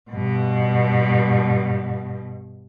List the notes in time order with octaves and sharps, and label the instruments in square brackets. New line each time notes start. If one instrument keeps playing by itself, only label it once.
[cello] G2 B2